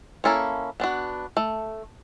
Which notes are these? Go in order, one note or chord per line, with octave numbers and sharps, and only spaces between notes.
A#3 C#4 E4 A4 C#5
B3 D4 F#4
A3